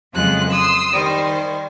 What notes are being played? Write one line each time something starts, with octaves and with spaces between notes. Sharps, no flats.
F2 C#3 F#3 G#3 F4 F#6
C6 D#6 E6
D#3 G3 C5